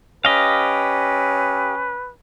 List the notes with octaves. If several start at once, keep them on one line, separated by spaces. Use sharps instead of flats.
C#4 G4 B4 D#5 F5